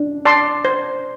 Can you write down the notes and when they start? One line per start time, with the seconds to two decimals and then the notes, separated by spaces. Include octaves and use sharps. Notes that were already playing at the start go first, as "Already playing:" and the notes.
Already playing: D4
0.25 D5 A5 C6
0.65 C5